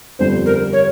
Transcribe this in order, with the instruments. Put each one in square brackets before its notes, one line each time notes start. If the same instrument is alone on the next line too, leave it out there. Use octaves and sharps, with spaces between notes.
[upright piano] G1 F2 D3 G3 [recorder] C5
[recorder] A#4
C#5